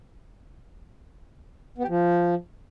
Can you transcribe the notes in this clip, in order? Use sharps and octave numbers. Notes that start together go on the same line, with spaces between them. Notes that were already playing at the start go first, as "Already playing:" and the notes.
B3
G4
F3